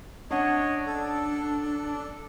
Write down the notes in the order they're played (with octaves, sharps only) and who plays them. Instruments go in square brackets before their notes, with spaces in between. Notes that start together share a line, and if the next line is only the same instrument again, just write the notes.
[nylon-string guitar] C#4 F#5 [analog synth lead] D4 [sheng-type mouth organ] C#5 D#5
[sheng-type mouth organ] A4